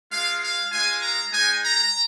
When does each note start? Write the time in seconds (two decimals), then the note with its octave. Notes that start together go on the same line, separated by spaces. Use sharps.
0.10 G#3 F4 F5
0.41 F5
0.71 G#3 F4 G#5
1.02 A#5
1.32 G#3 D#4 G#5
1.62 A#5